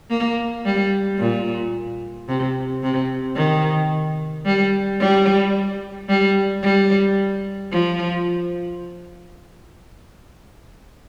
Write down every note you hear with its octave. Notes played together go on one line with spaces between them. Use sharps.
A#3
G3
A#2
C3
C3
D#3
G3
G3
G3
G3
F3